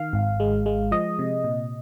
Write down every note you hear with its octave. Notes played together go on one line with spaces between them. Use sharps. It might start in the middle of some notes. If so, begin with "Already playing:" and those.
Already playing: D#3 F5
G#1
G#3
G#3
F3 D#5
C3
A#2